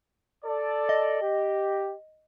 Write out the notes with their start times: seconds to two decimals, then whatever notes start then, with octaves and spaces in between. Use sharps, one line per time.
0.45 A4 D5
0.89 D#5
1.21 G4